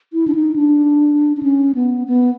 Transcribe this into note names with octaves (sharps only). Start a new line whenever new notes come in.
E4
D4
D#4
D4
D4
C#4
B3
B3